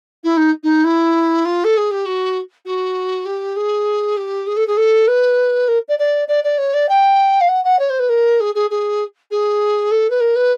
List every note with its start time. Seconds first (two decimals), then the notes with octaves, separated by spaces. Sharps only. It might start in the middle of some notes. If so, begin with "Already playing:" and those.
0.23 E4
0.36 D#4
0.63 D#4
0.84 E4
1.45 F4
1.64 A4
1.77 G#4
1.91 G4
2.05 F#4
2.65 F#4
3.25 G4
3.56 G#4
4.16 G4
4.46 G#4
4.56 A4
4.67 G#4
4.77 A4
5.07 B4
5.67 A#4
5.88 D5
5.98 D5
6.27 D5
6.43 D5
6.57 C#5
6.73 D5
6.88 G5
7.40 F5
7.48 F#5
7.64 F#5
7.79 C#5
7.89 C5
7.99 B4
8.09 A#4
8.40 G#4
8.54 G#4
8.70 G#4
9.30 G#4
9.91 A4
10.10 B4
10.20 A#4
10.35 B4